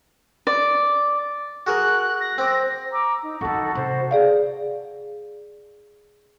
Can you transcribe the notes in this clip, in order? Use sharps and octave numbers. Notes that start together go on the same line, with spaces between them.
D5
F#4 G#4 A#4 F#6
A#6
C4 D6
A#5 D6 E6
D#4
D#3 E3 D#4 F#4 A4 B5
C3 A4 C5
G#4 D5 F5